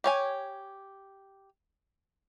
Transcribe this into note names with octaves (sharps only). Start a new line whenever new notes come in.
G4 C#5 G#5